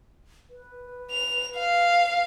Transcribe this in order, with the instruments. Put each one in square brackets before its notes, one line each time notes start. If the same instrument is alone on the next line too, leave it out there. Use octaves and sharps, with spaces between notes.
[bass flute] B4
[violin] F7
F5